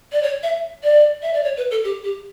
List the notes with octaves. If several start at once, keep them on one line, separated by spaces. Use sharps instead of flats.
D5
C#5
E5
D5
E5
D5
C#5
B4
A4
G4
G4